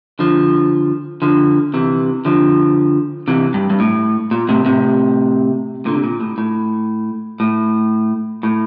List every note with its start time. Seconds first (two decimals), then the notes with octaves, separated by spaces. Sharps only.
0.19 D3 F3
1.22 D3 F3
1.74 C3 E3
2.25 D3 F3
3.28 C3 E3
3.54 G2
3.70 G2
3.80 A2
4.31 A#2
4.49 A2 C3
4.65 A2 C3
5.86 A#2 D3
5.95 C3
6.04 A#2
6.21 A2
6.38 A2
7.40 A2
8.43 A2